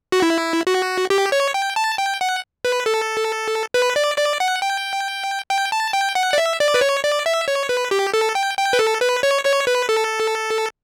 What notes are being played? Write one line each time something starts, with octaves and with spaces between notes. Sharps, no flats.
F#4
E4
F#4
G4
C#5
G5
A5
G5
F#5
B4
A4
B4
D5
D5
F#5
G5
G5
A5
G5
F#5
D5
E5
D5
B4
C#5
D5
E5
C#5
B4
G4
A4
G5
G5
B4
A4
B4
C#5
C#5
B4
A4